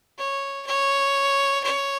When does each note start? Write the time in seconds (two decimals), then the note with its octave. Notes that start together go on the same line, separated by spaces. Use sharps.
0.18 C#5
0.66 C#5
1.64 C#5